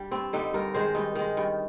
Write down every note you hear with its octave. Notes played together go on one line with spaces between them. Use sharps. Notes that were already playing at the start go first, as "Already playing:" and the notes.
Already playing: G3 D4
G2 C4
D3 G3 D#4
G2 A#4
D#3 G#3 C5
G2 D#4
D#3 G#3
G2